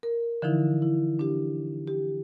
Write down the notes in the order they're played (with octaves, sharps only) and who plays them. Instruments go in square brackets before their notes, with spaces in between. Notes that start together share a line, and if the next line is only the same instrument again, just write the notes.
[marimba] A#4
D3 E3 F3 D#4 E4
E4
D4 G4
G4